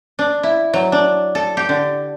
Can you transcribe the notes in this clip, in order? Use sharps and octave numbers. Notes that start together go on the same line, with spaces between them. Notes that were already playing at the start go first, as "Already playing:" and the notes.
D4
E4
F#3
D4
A4
G4
D3